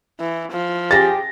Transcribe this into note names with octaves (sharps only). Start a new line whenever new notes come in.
E3
F3
G4 G#4 A6 A#6